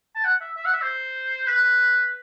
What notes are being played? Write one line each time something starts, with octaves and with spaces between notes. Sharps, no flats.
A5
F#5
E5
E5
F#5
E5
C5
B4